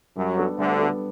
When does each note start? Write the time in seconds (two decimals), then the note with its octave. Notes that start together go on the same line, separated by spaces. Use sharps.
0.16 F#2 F#3 G3
0.37 B3 D4 A4
0.57 D2 D3 G3
0.79 B3 D4 A4